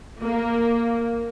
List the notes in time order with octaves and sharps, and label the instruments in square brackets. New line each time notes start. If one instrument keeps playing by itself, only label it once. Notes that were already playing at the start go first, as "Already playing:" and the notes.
[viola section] A#3